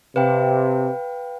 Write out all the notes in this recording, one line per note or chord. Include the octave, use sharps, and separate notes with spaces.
C3 B4 F5 G5